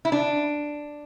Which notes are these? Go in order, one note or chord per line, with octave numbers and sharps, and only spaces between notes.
E4
D4